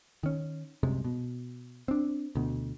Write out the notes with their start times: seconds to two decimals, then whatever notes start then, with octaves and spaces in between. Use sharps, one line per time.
0.23 D#3 C#4
0.83 C2 F#2 C3 G#3
1.04 B2
1.88 C4 D4
2.35 D2 B2